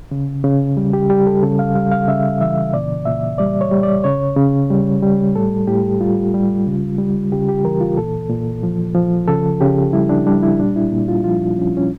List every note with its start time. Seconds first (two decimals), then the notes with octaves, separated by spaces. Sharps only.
0.11 C#3
0.44 C#3
0.77 G3
0.93 G4
1.10 G3 G4
1.27 A4
1.43 C#3 A4
1.59 F5
1.75 G3 F5
1.92 F5
2.08 C#3 E5
2.40 E3 E5
2.74 A#2 D5
3.06 A#2 E5
3.38 G3 D5
3.61 C#5
3.71 G3
3.83 D5
4.04 C#3 C#5
4.36 C#3
4.70 G3
5.02 G3
5.36 A2 A4
5.67 A2 G4
6.01 G3 F4
6.34 G3
6.67 C#3
6.98 G3
7.32 C#3 G4
7.49 G4
7.64 E3 A#4
7.81 F4
7.97 A#2 A4
8.30 A#2
8.63 F3
8.95 F3
9.27 C#3 A4
9.61 C#3 G4
9.93 G3 E4
10.09 D4
10.27 G3 D4
10.43 E4
10.60 A#2 D4
10.76 E4
10.92 A#2
11.08 F4
11.24 F3 F4
11.57 F3 C#4
11.77 C#4